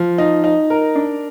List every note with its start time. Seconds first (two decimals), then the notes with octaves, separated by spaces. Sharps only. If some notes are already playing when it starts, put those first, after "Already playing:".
Already playing: F3
0.18 D#4
0.44 D#4
0.70 A#4
0.95 D4